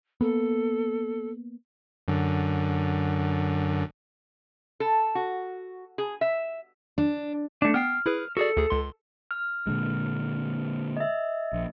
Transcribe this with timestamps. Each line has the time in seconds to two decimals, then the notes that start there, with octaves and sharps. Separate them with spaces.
0.21 A#3 B3 A4
2.08 F#2 D3
4.80 A4
5.15 F#4
5.98 G#4
6.21 E5
6.98 D4
7.62 A3 D4
7.74 B3 G5 F6 C7
8.06 E4 G#4 B4
8.37 F#4 G#4 A4 D5
8.57 D2 G#4
8.70 C#2 C6
9.31 F6
9.67 A#2 D3 G#3
10.97 D#5 E5
11.53 A#1